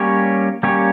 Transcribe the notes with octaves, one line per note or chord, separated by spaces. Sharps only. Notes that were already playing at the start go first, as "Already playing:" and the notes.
Already playing: G3 A#3 C#4 G4 C#5
G3 A#3 C#4 G4 C#5